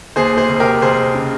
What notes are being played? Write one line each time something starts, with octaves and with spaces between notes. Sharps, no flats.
D#2 G#4 C5
G#4 C5
F1
G4 A#4
F1 G#4 C5
C#3